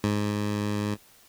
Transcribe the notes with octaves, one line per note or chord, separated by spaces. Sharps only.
G#2